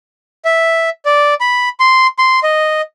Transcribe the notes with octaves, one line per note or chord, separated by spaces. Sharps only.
E5
D5
B5
C6
C6
D#5